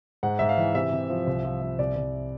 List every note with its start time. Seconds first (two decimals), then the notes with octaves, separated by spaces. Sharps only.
0.23 G#2 F#5
0.39 G#2 E5
0.49 F5
0.58 E3
0.74 C3 E5
0.92 C3
1.10 F3
1.27 C2
1.45 F3
1.62 F3
1.79 C2 D5
1.96 C2